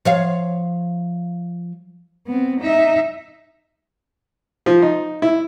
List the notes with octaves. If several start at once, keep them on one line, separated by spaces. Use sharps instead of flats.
F3 C#5 F5
B3 C4
D#4 E5
F3
D#4
E4